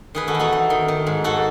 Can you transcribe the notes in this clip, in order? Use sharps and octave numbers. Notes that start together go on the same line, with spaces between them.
D#3 G#4 B4
F#4 A4
E2
D#4 F#4
E2
D#3
D#3
G#2
G#2 F#4 A4